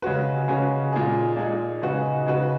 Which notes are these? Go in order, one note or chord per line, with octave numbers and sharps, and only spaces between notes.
C#3 G#3 C#4 F#4 B4
C#3 G#3 C#4 F#4 B4
A#2 G#3 D#4 G#4
A#2 G#3 D#4 G#4
C#3 G#3 D#4 F#4 B4
C#3 G#3 D#4 F#4 B4